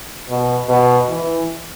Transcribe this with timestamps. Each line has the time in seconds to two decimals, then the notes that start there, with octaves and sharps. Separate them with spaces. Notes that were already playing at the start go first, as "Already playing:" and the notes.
0.29 B2
0.69 B2
1.09 E3